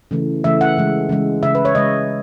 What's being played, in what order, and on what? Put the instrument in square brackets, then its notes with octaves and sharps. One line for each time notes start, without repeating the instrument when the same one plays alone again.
[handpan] C#3 E3 A3
C#3 E3 A3 E5
F#5
C#3 E3 G#3
C#3 E3 G#3
C#3 G#3 E5
B4
C#5
C#3 G#3 D#5